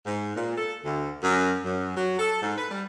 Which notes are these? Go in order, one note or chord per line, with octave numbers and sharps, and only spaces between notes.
G#2
A#2
A4
D2
F#2
F#2
F#3
A4
G#2
B4
G3